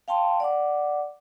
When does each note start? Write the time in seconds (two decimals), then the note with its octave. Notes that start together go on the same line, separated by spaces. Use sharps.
0.08 F5 G5 A5 C6
0.40 D5 F#5 D6